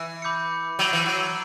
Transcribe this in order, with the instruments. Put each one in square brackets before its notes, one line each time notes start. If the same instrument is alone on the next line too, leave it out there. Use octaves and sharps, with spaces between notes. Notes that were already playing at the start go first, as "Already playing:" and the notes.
Already playing: [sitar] E3
[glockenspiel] B5 D6 G6 C#7
[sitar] F#3 [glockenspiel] E6 G6 D7 F#7
[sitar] E3
F#3